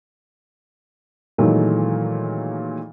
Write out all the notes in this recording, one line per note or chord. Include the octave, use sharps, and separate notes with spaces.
A#2 D#3 E3 F#3 G#3 A3